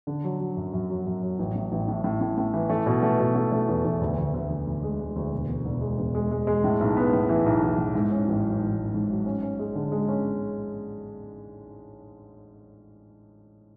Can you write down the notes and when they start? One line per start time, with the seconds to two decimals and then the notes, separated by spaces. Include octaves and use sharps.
0.07 D3
0.24 F#3
0.40 F#3
0.57 F#2
0.73 F#2
0.90 F#3
1.06 F#2
1.22 F#3
1.39 A1
1.55 A2
1.72 A1
1.88 A2
2.04 A2
2.21 A2
2.38 A2
2.54 E3
2.70 A3
2.86 B2
3.03 A3
3.19 B2
3.35 A3
3.52 A3
3.68 E2
3.85 E2
4.01 D2
4.18 D2
4.34 D2
4.50 D2
4.67 D2
4.83 G#3
5.00 G#3
5.16 D2
5.33 E1
5.49 E1
5.65 E1
5.81 G#3
5.98 E1
6.15 G#3
6.31 G#3
6.47 G#3
6.64 A2
6.80 B1
6.97 B3
7.13 A2
7.29 E3
7.46 B1
7.63 E3
7.78 A2
7.95 G#2
8.12 C#4
8.28 A1
8.45 F#3
8.61 A1
8.77 G#2
8.94 G#2
9.10 F#3
9.26 C#4
9.43 C#4
9.59 G#3
9.75 D3
9.92 G#3
10.08 C#4